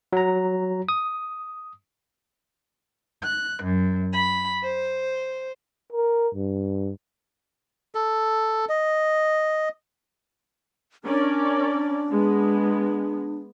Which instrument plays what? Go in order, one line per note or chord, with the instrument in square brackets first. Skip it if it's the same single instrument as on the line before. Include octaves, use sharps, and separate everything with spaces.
[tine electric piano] F#3 A#5
D#6
[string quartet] F#6
F#2
B5
C5
[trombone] A#4
G2
[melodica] A4
D#5
[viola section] C#4 A#4 D5 [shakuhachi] D4
[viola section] G#3 B3